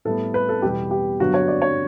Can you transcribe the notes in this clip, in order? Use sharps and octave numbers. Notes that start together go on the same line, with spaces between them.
A2 G3 B3 A4
B4
A4
E2 B2 G3 B3 G4
G4
G2 D3 F#3 B3 F#4
C#5
D5
C#5